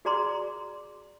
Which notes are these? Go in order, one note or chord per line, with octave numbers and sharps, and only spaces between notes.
F#4 G#4 D5 A#5 C6 D6